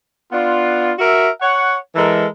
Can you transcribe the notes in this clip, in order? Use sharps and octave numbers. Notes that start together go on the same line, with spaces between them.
B3 D4 F4
F#4 A#4 E5
C#5 F#5
E3 G#3 A4 A#4